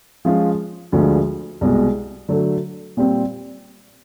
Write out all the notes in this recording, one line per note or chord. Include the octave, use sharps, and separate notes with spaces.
F3 G#3 C#4 F4
D2 D3 F3 G#3
C2 B2 G#3
D3 F#3 A3
A#2 G3 C4